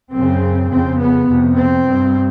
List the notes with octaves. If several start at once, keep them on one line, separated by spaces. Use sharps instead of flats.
F#2 C#3 C4
F2 C#3 C4
B3
F2 C3
C4
G2